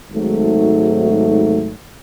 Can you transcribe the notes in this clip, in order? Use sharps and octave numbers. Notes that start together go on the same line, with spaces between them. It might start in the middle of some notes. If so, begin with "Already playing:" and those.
G#1 G#2 F#3 A3